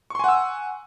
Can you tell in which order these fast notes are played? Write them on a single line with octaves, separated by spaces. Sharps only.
C#6 C6 G#5 F#5 E6